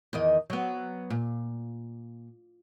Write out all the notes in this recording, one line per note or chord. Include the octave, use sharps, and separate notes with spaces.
E2 D#3 D#5
F#3 B3
A#2